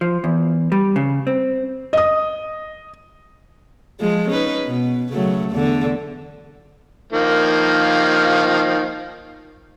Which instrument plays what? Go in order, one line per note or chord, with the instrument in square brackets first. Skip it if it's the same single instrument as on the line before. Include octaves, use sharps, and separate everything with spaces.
[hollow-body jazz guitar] F3
E2
G3
C#3
C4
[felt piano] D#5 D#6
[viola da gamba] F3 G#3
C#4 D#4 B4
B2
C#3 F#3 A3
E2 D3
[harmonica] D#3 F3 A#3